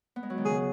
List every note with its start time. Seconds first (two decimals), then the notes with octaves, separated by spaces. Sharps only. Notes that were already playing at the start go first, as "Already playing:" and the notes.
0.16 B3
0.23 G#3
0.30 F#3
0.38 D#3
0.45 C#3 G#4